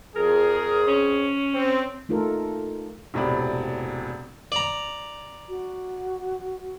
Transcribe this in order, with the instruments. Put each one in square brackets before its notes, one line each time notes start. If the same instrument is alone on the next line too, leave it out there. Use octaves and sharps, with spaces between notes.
[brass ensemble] F2 G#4 [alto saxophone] A#4
[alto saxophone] C#4
[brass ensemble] C4
[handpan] A3 D#4 F4 A4 A#4
[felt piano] E1 A2 C3 D5 B5
[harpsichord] D5 A#5
[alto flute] F#4